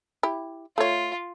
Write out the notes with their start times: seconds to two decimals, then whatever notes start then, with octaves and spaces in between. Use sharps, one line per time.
0.23 E4 G4
0.78 A3 F4 C#5